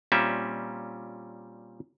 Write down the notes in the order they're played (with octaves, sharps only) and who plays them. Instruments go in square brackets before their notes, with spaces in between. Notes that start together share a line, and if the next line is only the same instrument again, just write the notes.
[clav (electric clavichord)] A#2 G3 C4 C#4 E5